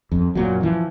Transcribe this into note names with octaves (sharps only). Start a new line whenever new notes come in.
F2
F#2 A#2 F#3
E3 F3